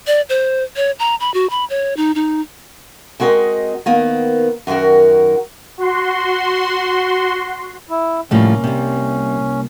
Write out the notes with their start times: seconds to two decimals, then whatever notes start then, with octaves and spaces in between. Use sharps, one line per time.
0.07 D5
0.29 C5
0.76 C#5
0.99 A#5
1.20 B5
1.34 F#4
1.50 B5
1.70 C#5
1.97 D#4
2.15 D#4
3.20 G#3 C4 F#4 A#4 D#5
3.86 D#3 A#3 B3
4.67 F#2 D#3 D4 F#4 A#4
5.78 F#4 C6
7.90 E4
8.31 C2 A2 F3 G3 A#3 C#4
8.64 C3 G3